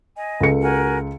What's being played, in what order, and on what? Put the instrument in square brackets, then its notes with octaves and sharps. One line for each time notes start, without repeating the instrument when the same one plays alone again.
[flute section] D#5 G#5
[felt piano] C#2 A4 C#7
[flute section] F#4 A#4 G#5